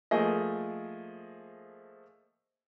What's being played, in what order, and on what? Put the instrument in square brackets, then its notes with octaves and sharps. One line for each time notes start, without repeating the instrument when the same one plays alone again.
[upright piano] F3 A3 A#3 G#4 D#5